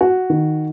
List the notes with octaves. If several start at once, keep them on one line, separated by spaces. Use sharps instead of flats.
F#4
D#3